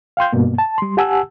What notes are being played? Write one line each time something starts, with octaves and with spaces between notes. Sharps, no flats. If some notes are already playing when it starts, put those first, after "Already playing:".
F5 G5 C6 G6
G2 B2 A#3
A5
G3 C6
G4 F#5 G#5 A5 E6